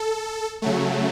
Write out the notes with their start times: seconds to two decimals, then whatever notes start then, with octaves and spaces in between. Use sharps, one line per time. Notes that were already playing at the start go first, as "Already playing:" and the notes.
Already playing: A4
0.62 C#3 F#3 A3